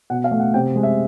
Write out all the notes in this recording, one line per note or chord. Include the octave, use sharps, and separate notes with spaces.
B2 F#5
F5
A3
F#5
C3 G5
G#3
E5